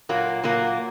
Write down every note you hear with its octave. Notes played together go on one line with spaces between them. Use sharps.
A#2 F#3 A#3
A#2 F#3 A#3